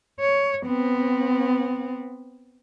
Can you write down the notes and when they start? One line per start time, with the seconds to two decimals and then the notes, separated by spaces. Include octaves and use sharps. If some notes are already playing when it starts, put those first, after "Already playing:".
0.20 C#5
0.66 B3 C4